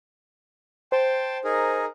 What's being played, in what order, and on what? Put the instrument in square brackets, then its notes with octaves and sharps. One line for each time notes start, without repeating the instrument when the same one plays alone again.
[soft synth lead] C5 [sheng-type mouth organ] G5 A5 C6
[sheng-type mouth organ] D#4 G#4 A#4